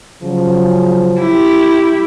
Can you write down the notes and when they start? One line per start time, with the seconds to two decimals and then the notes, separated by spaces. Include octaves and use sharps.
0.23 C#3 F3 F#3
1.20 E4 G4